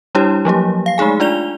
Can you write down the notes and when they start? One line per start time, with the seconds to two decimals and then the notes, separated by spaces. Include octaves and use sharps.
0.15 G3 D4 E4 G4 C#5
0.45 F3 F#3 A#3 G4
0.86 F5 C7
0.98 G#3 A3 D#4 G#4 G#5
1.20 D4 F4 D5 F7 G7